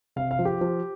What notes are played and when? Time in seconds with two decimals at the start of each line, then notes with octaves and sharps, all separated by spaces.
0.16 C3 F5
0.31 F5
0.39 F3
0.45 G4
0.61 F3